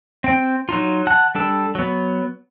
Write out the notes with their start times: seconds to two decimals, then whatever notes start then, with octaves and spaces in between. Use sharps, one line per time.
0.24 C4 G5
0.69 F#3 D#4 F4
1.07 F#5 A5 F#6
1.35 G3 D4 A4
1.75 F#3 B3